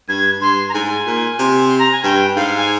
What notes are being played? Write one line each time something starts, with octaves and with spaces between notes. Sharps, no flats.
G2 G#6
G2 C6
A#5
G#2 G#5
A#2
C3
C6
A#5
G#5
G2 G5
G#2 F5
G#5